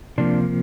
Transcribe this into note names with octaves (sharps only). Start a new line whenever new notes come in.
C3 F3 A#3 D4